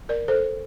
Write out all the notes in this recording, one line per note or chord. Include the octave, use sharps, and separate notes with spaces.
A#4 D5
A4 C5